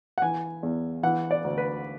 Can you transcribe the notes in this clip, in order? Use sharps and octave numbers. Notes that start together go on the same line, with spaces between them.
F#5
E3 G#5
E2
E3 F#5
D5
D2
B4